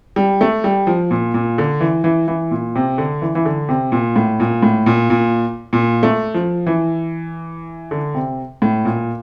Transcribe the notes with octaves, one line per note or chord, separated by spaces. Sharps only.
G3
A3
G3
F3
A#2
A#2
D3
E3
E3
E3
A#2
C3
D3
E3
E3
D3
C3
A#2
A2
A#2
A2
A#2
A#2
A#2
A3
F3
E3
D3
C3
A2
A#2